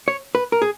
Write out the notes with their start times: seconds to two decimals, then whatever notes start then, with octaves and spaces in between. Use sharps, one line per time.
0.08 C#5
0.35 B4
0.52 A#4
0.62 G#4